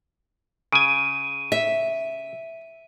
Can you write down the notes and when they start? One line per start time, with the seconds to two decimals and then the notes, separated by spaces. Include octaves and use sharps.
0.72 C#3 G#5 D7 D#7
1.52 E5